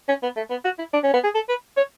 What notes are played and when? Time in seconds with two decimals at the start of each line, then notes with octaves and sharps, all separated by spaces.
0.08 C#4
0.23 B3
0.37 A3
0.50 B3
0.65 F#4
0.78 E4
0.93 D4
1.04 C#4
1.14 B3
1.24 G#4
1.35 A4
1.49 B4
1.77 C#5